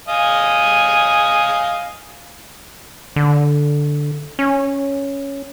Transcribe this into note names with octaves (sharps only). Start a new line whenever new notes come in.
D#5 F5 G#5
D3
C#4